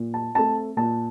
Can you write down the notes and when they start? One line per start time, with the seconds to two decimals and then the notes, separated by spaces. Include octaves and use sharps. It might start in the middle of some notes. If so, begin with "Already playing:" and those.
Already playing: A#2
0.14 A5
0.35 A3 C4 A5
0.77 A#2 A5